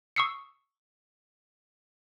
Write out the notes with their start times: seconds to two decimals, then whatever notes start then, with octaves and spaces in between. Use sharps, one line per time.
0.16 C#6 D#6 E6 C7 C#7